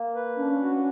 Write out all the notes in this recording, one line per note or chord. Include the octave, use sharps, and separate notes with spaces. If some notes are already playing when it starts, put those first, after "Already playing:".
Already playing: A#3
B4
C#4 D4
F#4